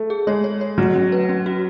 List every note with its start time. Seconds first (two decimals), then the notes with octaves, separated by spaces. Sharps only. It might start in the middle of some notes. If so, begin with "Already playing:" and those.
Already playing: A3
0.10 G#4
0.27 G#3 C#5
0.44 C#5
0.61 C#5
0.78 F#3 A3
0.95 C#4
1.12 B4
1.29 C#4
1.46 F#4